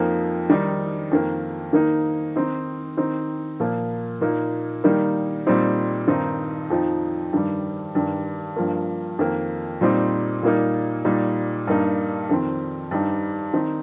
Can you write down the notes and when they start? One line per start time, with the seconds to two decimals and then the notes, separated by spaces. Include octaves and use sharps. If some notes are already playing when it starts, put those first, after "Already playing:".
Already playing: F2 F3 A#3 D#4
0.50 D#3 G3 D#4
1.11 F2 D#3 A#3
1.73 D#3 A#3 D#4
2.36 D#3 C4 D#4
2.97 D#3 C4 D#4
3.60 A#2 F3 A#3
4.21 A#2 A#3 D#4
4.84 D#3 G3 A#3 D#4
5.47 A#2 G3 C4 D#4
6.08 G2 D#3 C4 D#4
6.70 F2 F3 D#4
7.33 G2 D#3 G3
7.95 G2 D#3 G3
8.56 G2 F3 A#3
9.19 F2 D#3 A#3
9.81 A#2 G3 C4 D#4
10.43 A#2 G3 A#3 D#4
11.05 A#2 G3 D#4
11.67 G2 G3 A#3 D#4
12.29 F2 D#3 C4
12.91 G2 G3 D#4
13.54 D#3 C4 D#4